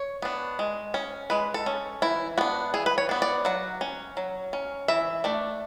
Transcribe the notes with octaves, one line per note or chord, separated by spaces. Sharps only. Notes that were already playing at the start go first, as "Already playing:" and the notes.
Already playing: C#5
B3 D4
G#3
C#4
G#3 B4
A4
C#4
E3 E4
B3 D4 F#4
E3 G#4
B4
C#5
B3 D4
D5
F#3 F#5
C#4
F#3
C#4
E3 E5
A3 D4 D5